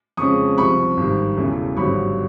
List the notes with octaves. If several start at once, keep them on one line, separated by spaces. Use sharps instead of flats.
F2 C#3 F3 G#3 C#4 C#6 D#6
C2 C3 F3 B5 C#6
G#1 G2 D#3
E1 E2 C#3 E3 A3
G#1 G2 D3 F#3 B5 C#6